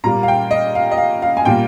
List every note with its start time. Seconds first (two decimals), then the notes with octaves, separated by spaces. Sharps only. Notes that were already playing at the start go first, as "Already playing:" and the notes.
0.04 A#2 G3 A#3 A#5
0.23 F5
0.28 G5
0.51 D#5
0.75 F5
0.91 D#5
0.98 F5
1.22 F5
1.37 G#5
1.45 A#2 G3 A#3 G5